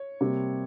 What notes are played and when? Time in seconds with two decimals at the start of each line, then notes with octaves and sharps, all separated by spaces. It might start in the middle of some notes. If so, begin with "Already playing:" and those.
Already playing: C#5
0.21 C3 G3 A#3